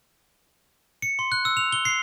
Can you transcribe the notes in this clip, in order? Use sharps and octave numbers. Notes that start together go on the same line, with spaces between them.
C#7
C6
F#6
E6
F7
G7
C7